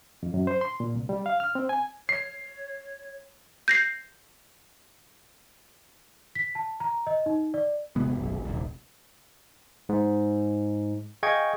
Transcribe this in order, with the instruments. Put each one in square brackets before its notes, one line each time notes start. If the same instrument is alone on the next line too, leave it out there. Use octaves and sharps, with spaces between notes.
[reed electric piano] F2
F#2
C5
C6
A#2
C2
G3
F5
F6
C4
G#5
[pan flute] C#5 [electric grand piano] C7
[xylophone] G6 A#6 C7
[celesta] B6
A5
A#5
D#5
D#4
D5
[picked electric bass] E1 C3 G#3 B3
F#1 B1
D#1 C2
[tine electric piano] G#2
G#4 D#5 F5 G5 C#6 G#6